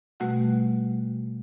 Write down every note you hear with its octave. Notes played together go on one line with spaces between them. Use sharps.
B2 G3 A3 F#4 F#5